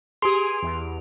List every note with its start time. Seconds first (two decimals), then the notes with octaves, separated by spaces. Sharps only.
0.22 G4 G#4 C6 D7 F7
0.62 E2